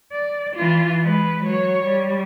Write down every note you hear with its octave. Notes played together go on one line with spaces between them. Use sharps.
D5
E3 F4
G#3 B4
F#3 C#5
G3